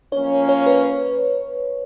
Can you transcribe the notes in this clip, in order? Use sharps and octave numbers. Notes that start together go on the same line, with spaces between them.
F3 A#3 C#4 C#5
C#5
B4